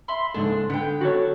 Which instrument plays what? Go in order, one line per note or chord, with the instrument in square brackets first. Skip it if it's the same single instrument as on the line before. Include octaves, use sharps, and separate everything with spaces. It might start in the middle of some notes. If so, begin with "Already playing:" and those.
[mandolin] E5 B5 C6
[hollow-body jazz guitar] C#2 G#2 A4 [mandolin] D4 D#5
[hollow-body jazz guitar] D3 [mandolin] B3 G5
[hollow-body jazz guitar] F#4 A4 C#5